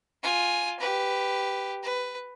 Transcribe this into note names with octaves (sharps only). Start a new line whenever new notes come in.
F4 G#5
G4 B4
B4